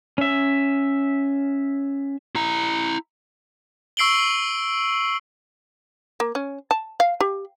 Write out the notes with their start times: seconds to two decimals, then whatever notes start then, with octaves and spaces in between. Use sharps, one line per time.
0.18 C#4 E5
2.35 E4 A#5
3.97 C#6 E6 C7 D7 F#7 G7
6.20 A#3
6.35 C#4
6.71 A5
7.00 F5
7.21 G4